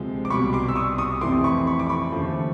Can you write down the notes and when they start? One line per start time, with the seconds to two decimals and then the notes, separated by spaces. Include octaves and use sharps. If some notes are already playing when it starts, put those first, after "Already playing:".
Already playing: D2 C3 F3 G#3
0.25 D6
0.30 C2 B2 G3 B5 C#6
0.53 C6 D6
0.68 E6
0.75 C#6 D#6
0.98 C#6 D#6
1.21 F2 C3 E3 A3 C6 D6
1.44 B5 C#6
1.67 B5 C#6
1.80 D6
1.89 B5 C#6
2.12 D#2 C#3 F3 A3